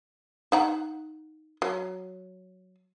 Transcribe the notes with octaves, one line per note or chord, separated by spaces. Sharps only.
D#4 F#5 A#5
F#3